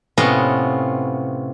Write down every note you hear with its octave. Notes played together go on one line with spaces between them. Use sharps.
A2 C3 B3 C#4 F4 D#5